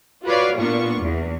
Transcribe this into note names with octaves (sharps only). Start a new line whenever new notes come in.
F4 F#4 B4 C#5 D5 F5
A#2 A#3 B3 D4 F4 C#6
E2